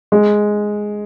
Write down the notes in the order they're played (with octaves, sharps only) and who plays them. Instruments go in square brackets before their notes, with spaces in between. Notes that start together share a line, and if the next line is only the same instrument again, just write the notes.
[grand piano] G#3